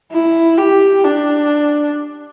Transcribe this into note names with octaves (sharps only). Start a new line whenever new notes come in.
E4
G4
D4